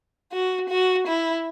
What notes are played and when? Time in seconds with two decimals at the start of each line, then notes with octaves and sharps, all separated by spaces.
0.32 F#4
0.70 F#4
1.08 E4